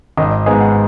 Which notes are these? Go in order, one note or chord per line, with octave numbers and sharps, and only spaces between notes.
G#1 D#5
D#5
G#2 G#3 B3 G#4
F#5